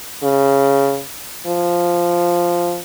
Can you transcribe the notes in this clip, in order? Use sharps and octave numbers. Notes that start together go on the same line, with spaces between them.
C#3
F3